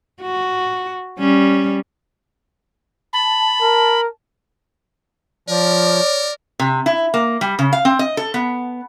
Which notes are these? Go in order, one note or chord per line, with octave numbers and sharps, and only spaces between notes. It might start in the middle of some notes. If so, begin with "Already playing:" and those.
F#4
G3 C#4
A5 B5
A#4
F3 A#4 C#5 D5
C3
E4
A#3
G3
C#3
F5
C4
D#5
A4
B3